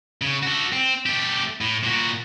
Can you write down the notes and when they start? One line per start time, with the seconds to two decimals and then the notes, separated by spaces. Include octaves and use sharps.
0.22 C#3
0.43 F#4 A4
0.72 C4
1.06 A3 G4
1.61 A2
1.84 A#2 F#4